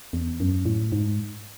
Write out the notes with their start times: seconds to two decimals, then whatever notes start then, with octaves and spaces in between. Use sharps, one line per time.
0.13 E2
0.40 F#2
0.65 A2
0.92 G#2